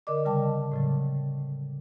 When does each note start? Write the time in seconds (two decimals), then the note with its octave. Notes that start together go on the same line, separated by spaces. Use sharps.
0.07 D3 A#4 D5 D#5 D6
0.25 C#3 G3 G5 A5
0.72 A2 C#3 F#3